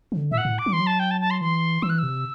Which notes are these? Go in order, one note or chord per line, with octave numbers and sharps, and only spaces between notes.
E3
D3
A2 E5
F#5
A2
D6
F#3
E3 C6
F#3
A5
G5
A5
A5
C6
E3 C6
E3 E6
F#6
C3 E6